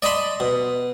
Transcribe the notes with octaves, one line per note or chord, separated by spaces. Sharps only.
D5 D#5 A5 B5 C6
B2